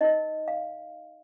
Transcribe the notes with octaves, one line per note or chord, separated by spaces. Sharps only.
D#4 A#4 D#5
F5